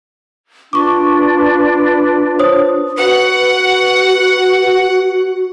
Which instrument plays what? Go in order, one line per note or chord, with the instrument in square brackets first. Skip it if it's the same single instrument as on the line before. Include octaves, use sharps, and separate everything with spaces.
[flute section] D4 F4 B4 [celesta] C#6 D6
[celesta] C5 C#5 D#6
[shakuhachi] F#4 [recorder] B4 [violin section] F#5